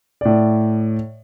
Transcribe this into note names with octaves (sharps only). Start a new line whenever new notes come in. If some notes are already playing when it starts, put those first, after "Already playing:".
A2 D5